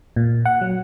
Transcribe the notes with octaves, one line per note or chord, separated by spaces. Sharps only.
A#2
F#5
F#3